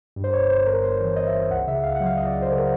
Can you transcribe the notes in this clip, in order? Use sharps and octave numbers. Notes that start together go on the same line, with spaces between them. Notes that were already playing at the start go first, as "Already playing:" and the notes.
G2
C5
G1 C#5
G1 C5
G1 A#4
G1 C5
E3
G1 D#5
E5
G1
C#2 F#5
C#3 E5
C#2 F5
F#3 F#5
F5
C#2 D#5
D5
C#2
C5
C#3 A#4